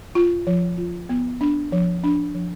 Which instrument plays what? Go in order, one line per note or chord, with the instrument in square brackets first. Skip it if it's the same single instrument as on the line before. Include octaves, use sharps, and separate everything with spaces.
[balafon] F4
F3
F4
B3
D4
F3
D4
F3